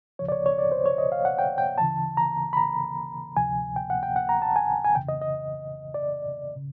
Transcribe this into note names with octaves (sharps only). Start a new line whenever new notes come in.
D2 C#3 F3 C#5
D5
C#5
C#5
D5
C5
C#5
D#5
F5
F#5
G5
G5
D2 C#3 E3 A5
A#5
B5
A#5
D2 C3 F3 G#5
G5
F#5
G5
F#5
A#5
A5
G#5
G#5
F2 C#3 E3 G5
D#5
D#5
D5
C#3